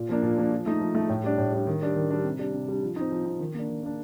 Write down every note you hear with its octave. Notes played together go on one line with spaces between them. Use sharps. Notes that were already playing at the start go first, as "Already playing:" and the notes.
Already playing: A#2
F3 A#3 D4
A#2
F3 A#3 D4
F3
A3 D#4
F3
A3 D#4
A2
G3 D4
A2
G3 D4
D#3
G3 D4
D#3
G3 D4
C3
G3 D4
C3
G3 D4
F3
C4 D#4
F3
C4 D#4
D#3
A#3 D4
D#3
A#3 D4